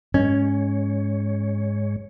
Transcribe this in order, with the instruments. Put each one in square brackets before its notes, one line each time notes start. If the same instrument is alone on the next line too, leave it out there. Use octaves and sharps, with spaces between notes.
[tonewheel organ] G#2 G#3 C#5 [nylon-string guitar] C#4